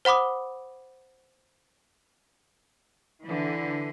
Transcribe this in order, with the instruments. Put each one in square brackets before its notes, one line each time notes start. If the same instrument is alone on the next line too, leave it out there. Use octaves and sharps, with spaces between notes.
[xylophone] C5 F#5 B5 D6 D#6
[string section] D3 E3